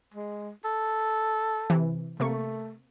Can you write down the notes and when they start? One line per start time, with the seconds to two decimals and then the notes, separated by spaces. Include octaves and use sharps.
0.14 G#3
0.65 A4
1.70 C3 E3
2.20 C3 A3 A#3 C#6